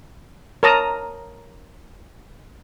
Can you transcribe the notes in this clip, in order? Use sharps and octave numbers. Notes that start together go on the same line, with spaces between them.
A#4 C#5 A5 A#5 D#6